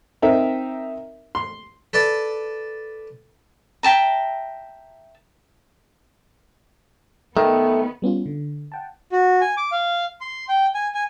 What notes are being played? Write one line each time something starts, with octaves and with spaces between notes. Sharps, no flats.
C4 D#4 A#4 E5
C6
A4 B4 D5 A5
E5 G5 A5 A#5
D#3 A3 B3
G3 B3 C#4 F4
D3
F#5 G5 A5
F#4
G#5
D6
F5
C6
G5
G#5
G#5